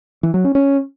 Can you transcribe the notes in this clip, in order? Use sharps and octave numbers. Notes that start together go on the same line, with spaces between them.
E3
F#3
C#4
C#4